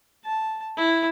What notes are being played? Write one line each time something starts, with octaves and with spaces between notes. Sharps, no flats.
A5
E4